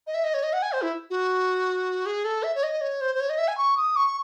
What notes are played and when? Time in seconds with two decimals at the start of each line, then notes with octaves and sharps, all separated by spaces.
0.07 D#5
0.14 E5
0.24 D#5
0.34 C#5
0.43 D#5
0.53 F#5
0.62 G#5
0.72 C5
0.82 E4
1.10 F#4
2.06 G#4
2.24 A4
2.43 E5
2.55 C#5
2.63 D#5
2.81 C#5
3.01 C5
3.15 C5
3.20 C#5
3.29 D#5
3.38 E5
3.48 G#5
3.57 C#6
3.77 D#6
3.96 C#6